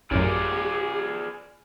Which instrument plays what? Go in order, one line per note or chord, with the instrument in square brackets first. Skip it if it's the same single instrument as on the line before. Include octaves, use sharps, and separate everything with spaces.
[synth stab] A1 F#2 [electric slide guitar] F4 G#4 D5 [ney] G4